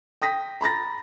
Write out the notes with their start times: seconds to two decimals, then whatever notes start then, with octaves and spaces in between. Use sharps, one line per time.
0.22 G5 D#6 A#6 B6
0.61 A#5 B5 A6 A#6